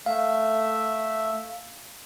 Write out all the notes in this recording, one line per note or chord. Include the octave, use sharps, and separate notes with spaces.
A3 E5 F5